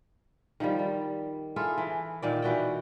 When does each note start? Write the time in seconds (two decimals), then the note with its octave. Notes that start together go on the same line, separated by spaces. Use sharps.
0.60 D#3 F3 G3
0.79 G3
1.56 E4 F4 G#4 A4
1.78 E3
2.22 A#2 D#3 D5
2.42 B2 E3 F#4 G5